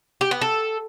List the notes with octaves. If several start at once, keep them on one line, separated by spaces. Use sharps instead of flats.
G4
B3
A4